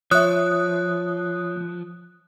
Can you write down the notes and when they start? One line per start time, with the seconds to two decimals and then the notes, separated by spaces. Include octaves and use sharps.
0.11 F3 C#5 E5 D#6 F#6